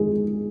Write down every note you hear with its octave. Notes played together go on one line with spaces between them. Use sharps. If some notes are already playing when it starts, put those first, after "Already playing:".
Already playing: D#3 G#3 G#4